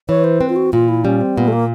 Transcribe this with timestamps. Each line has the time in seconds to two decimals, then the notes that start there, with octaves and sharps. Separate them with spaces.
0.09 E3 C#5
0.24 C5
0.41 C4 B4
0.49 F4
0.56 F#4
0.73 A#2 F4
0.88 E4
1.04 G3 C#4
1.21 C4
1.36 A#2 B3
1.48 A3
1.53 A#3